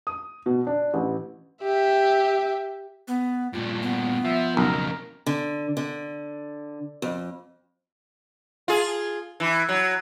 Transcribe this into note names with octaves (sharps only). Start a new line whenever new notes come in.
D#6
B2
D4
A1
G4 E5
B3
G2 A#2 F4
B3
F3 E5
B1 F2 C#3 A#4
D3
D3
F2
F4 G#4
E3
F#3